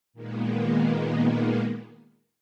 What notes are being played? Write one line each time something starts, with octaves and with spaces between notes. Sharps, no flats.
A#2 D#3 G#3 A#3 B3